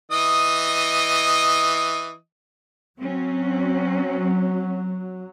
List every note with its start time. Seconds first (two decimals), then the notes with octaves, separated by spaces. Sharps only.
0.11 E3 D#5 D#6
3.00 F#3 C4 C#4